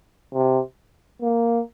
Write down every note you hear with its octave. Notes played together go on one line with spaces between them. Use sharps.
C3
A#3